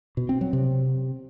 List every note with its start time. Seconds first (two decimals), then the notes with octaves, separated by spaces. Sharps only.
0.17 B2
0.29 C4
0.41 F#3
0.53 C3